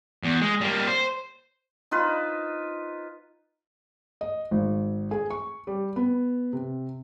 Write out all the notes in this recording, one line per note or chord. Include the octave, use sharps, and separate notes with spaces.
E2
G#3
G3 A#3
C5
D#4 F4 B4 C5
D#5
G#1
G#4
C#6
G3
B3
C3